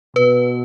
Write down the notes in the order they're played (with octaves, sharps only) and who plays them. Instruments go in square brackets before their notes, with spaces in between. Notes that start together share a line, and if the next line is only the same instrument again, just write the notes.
[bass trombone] B2 [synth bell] B4